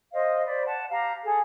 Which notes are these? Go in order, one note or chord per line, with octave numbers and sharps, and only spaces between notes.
C5 D#5 F5
C5 D5 B5
F#5 A5
G4 F5 A#5
G#4 A4